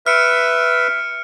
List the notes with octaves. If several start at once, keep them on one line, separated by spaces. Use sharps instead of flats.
B4 E5 F6 C#7 D7